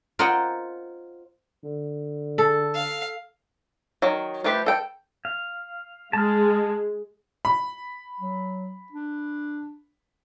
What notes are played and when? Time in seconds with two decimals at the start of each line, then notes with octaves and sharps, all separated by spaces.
0.19 F4 A#4 C5 D#5 F#5 G5
1.63 D3
2.38 A4
2.74 F5
4.02 D#3 F#3
4.44 F3 A3 G4 B4 C5
4.66 A4 G5
5.25 F5
6.13 G#3 A5 F6
7.45 B5
8.20 F#3
8.92 D4